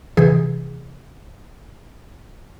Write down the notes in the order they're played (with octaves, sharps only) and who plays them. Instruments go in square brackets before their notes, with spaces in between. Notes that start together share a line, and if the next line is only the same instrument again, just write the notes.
[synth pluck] C3 E3 G#4